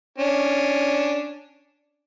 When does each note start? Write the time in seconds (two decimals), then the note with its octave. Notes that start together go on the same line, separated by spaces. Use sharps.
0.18 C#4 D4